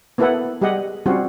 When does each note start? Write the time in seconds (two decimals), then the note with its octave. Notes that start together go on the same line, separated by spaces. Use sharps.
0.18 A#3 B3 E4 A4 B4 F#5
0.61 G3 G4 G#4 D#5 F#5
1.06 G3 C4 C#4 F4 F#4